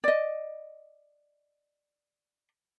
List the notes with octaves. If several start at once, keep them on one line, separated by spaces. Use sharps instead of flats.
D5 D#5